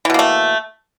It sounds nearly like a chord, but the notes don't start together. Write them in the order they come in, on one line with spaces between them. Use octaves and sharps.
E3 B2 A#3 A3